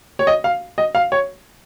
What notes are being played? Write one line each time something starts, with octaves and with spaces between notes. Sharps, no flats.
C#5
D#5
F5
D#5
F5
C#5